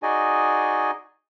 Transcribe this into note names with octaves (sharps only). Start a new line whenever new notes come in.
D#4 F#4 G#4 D5 D#5 G#5